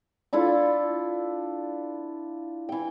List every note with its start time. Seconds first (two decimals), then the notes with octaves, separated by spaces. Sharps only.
0.33 D4 E4 F4 A4
2.69 E3 G5